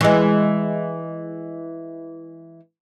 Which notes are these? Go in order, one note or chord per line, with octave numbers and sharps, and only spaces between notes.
E3 G#3